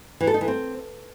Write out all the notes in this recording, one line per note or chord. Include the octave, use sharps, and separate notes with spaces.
E3
A4
D#4
E3
C4